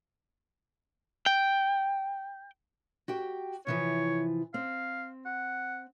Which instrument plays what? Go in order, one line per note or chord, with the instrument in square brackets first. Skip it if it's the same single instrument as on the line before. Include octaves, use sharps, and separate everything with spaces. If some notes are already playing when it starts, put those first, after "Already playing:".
[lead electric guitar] G5
[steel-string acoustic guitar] F#4 G4 G5
[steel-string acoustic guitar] C3 E3 F3 [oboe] C#5
[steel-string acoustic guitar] C4 [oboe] F5
[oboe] F#5